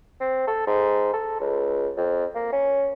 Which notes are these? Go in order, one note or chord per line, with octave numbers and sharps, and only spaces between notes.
C4
A4
G#2
A4
C#2
F2
A#3
C#4